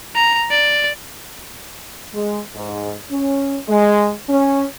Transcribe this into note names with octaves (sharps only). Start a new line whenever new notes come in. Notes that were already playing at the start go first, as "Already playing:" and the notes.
A#5
D5
G#3
G#2
C#4
G#3
C#4